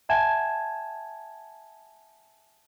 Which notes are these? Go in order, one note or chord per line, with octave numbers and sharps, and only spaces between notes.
E5 F#5 G#5 A5 G#6 E7